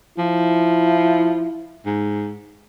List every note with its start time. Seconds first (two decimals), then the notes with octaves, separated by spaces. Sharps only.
0.18 F3 E4
1.86 G#2